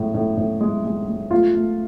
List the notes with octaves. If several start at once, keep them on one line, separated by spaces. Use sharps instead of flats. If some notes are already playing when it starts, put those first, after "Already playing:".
Already playing: A2 G#3
A2
A2
G#3
G#3
G#3
A3 F4
A3